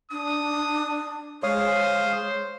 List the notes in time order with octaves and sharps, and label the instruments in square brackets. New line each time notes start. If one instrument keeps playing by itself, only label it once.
[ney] D4 [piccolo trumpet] D#6
[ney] G#3 [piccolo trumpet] C5 [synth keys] C#5 [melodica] F5 D#6